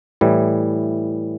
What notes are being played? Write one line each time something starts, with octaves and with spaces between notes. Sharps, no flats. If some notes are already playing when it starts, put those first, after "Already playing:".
A2 E3 G3